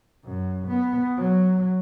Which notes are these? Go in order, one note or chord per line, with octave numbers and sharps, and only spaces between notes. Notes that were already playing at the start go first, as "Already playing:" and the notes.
F#2
B3
F#3